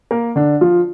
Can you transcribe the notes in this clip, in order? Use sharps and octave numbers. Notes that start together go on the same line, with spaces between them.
A#3 A#4
D3 D4
F3 F4